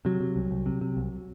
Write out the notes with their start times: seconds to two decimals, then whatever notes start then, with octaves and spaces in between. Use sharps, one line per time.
0.05 C3 F#3
0.21 C3
0.36 C2
0.51 C2
0.66 C3
0.81 C3
0.97 C2